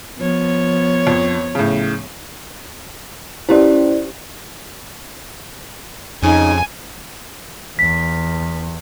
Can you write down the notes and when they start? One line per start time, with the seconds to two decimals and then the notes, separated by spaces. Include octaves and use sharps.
0.18 F3 B3 C#5
1.07 F2
1.55 A2 C#3
3.49 C#4 E4 G4 C5 D5
6.23 F2 C#3 D#4 G#5
7.79 E2 B6